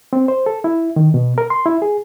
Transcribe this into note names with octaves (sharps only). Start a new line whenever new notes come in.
C4
C5
A4
E4
D#3
B2
A#4
C6
E4
G#4